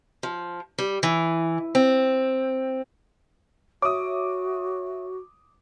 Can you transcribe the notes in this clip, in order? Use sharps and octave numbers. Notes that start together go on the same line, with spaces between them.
F3
G3
E3
C4
F#4 C#5 E5 D6 D#6